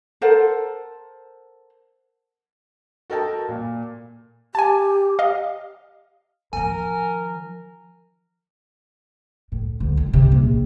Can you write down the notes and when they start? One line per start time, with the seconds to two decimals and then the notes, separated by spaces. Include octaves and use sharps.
0.22 A4 A#4 C5 F#5
3.10 F#4 A4 A#4 D#5 G5 A5
3.48 A#2
4.55 G4 G#5 A5
5.19 D#5 F5
6.53 D#3 F3 A#4 G#5
9.52 A2
9.80 D2
9.97 D#3
10.13 C3
10.32 A#1